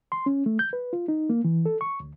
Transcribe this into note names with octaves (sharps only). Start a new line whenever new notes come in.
C6
C#4
A3
G6
B4
F4
D#4
A#3
E3
A4
C#6
D2